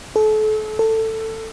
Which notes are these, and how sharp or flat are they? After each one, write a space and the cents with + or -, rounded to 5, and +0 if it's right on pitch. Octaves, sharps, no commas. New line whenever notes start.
A4 -35
A4 +15